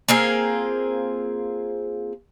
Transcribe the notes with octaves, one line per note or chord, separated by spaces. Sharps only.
A#3 C4 F4 G#4